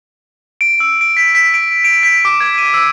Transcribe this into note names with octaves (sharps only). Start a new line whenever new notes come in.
D7
E6
D7
B6
B6
D7
D7
B6
D6
G#6
D#7
E6